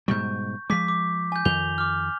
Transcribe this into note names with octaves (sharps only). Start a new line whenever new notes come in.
G#2 B2 G3 C#6 G6
F3 G#3 D6 B6
D6
G#5 G6
F2 D#3 G6 F7 G7
D6 F6